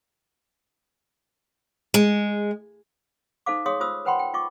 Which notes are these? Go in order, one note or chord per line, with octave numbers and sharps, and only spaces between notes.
G#3
D#4 A4 C5 F5 D6
G#4 C#5 F5 C6 D#6
F4 C5 D#6 E6
B4 C5 F#5 G5 B5 C6
G5
F4 D#5 C#6 D6